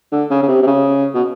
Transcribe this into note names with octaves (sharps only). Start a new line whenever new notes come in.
D3
C#3
C#3
C3
C3
C#3
B2